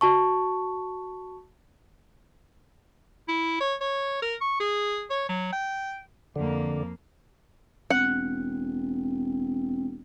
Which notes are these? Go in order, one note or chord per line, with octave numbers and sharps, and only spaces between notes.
F#4 A5 C#6
E4
C#5
C#5
A#4
C#6
G#4
C#5
F#3
G5
F2 D3 A#3
E1 C4 F#5